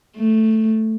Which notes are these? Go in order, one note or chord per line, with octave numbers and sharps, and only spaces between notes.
A3